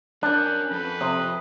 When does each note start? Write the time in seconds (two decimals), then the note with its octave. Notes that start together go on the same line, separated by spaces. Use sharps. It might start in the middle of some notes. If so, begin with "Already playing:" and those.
0.23 C#4 D4 A#4 F#6 G6
0.71 F2 A4 B4
1.01 C3 E5 D#6